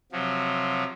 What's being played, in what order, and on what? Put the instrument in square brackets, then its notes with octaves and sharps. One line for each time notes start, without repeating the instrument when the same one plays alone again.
[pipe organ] C3 F3 F#3